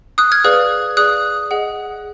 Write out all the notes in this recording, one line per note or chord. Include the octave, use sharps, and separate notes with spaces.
D#6 F#6
F6 G#6
G#4 B4 D5 F5 D#6 F#6
G#4 D5 F5 D#6 F#6
G#4 D#5 F#5